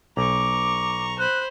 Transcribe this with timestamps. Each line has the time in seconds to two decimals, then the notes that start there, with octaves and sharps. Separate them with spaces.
0.17 B1 A#5 C#6 D6
1.19 C5 B5 F#6